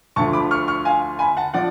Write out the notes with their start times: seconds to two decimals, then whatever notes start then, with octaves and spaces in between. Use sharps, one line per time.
0.16 D2 D3 F3 A5 C#6
0.33 B5 D6
0.51 C#6 F6
0.68 C#6 F6
0.85 F5 G#5
1.19 G#5 B5
1.37 F#5 A5
1.54 F3 D5 F#5